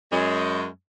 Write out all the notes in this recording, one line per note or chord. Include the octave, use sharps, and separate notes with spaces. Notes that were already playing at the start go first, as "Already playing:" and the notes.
F#2 G#3